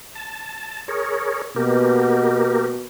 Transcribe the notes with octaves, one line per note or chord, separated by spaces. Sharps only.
A5
G#4 A#4 C#5
B2 A#3 G4 A#4